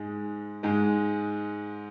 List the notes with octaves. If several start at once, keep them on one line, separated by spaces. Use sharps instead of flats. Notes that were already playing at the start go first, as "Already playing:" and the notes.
Already playing: G#2 G#3
G#2 G#3